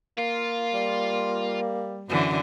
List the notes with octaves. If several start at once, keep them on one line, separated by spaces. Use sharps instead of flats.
A#3 F4
G3
F#2 D3 E3